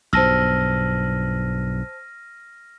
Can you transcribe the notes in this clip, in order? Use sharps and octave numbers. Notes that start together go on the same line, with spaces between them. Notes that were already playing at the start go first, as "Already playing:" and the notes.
B1 G2 C5 A5 E6 F6 A#6 D#7